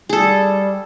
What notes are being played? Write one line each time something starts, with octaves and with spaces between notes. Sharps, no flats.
G3 G#4 A4